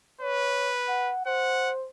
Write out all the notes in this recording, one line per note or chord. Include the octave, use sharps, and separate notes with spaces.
B4 C#5
F#5
C5 F#5